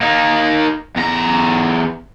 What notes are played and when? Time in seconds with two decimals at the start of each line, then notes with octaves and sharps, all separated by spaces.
0.01 A#3 D#4
0.96 E2 A#5